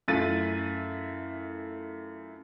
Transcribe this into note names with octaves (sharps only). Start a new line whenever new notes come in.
F#2 A3 E4 F4 A6 D#7